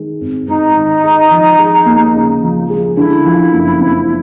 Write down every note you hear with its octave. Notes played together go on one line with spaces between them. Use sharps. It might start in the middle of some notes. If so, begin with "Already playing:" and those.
Already playing: D#3 G#3
G#1
G#2 D#4
D#3
G#3
F3
G#3
D#2
C#3
F3
G#3
D3 E4
F3
F#1
F2